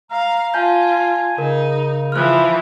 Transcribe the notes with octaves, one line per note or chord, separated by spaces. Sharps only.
F5 A#5
F4 F5 G#5 A5 G6
C#3 D#4 A#4
E3 F3 F6 F#6